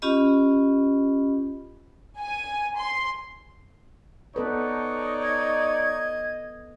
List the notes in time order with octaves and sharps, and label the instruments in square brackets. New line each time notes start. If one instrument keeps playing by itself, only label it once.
[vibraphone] C#4 F4 G4 D#5 B5
[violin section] G#5
C6
[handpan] B3 A4 B4 [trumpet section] D#4 C#5 D5
[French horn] D#5 [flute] G#6